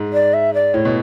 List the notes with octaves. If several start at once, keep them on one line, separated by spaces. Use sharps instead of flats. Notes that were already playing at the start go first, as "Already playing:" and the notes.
Already playing: G#2
D5
E5
D5
A2 C#5
B2